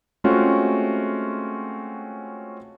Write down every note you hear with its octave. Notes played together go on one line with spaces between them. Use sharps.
G#3 A3 C4 C#4 F4 F#4